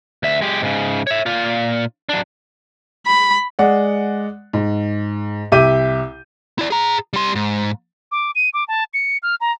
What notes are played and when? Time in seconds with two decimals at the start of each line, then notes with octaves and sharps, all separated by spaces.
0.23 D2 E5
0.41 G#3 G4
0.62 G#2 C#3
1.07 C#5 E5
1.26 A#2 F4
2.09 F#3 D4
3.06 B5
3.59 G#3 D5 F#5
4.53 G#2
5.52 C2 G4 E5 D6 G6 D#7
6.59 E4 D5
6.70 G#4 A#5
7.13 G3 C6
7.35 G#2
8.11 D6
8.35 D#7
8.54 D6
8.68 A5
8.94 C#7
9.23 F6
9.41 A#5